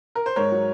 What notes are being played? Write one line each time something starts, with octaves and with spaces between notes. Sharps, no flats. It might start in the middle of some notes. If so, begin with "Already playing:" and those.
A#4
C5
G#2 A#4 C#5
F#3